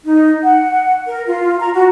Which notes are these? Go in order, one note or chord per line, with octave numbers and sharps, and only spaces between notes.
D#4
F#5
A#4
F4
A#5
F#4